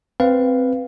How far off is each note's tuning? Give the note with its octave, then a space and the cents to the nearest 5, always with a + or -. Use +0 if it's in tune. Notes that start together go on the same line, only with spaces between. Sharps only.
C4 +0 B4 +0 F5 +0